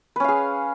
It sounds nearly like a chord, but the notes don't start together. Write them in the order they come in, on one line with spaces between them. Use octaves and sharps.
B4 C#4 F5 G#4